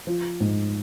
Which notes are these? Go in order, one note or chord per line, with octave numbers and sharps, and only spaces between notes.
F3
G#2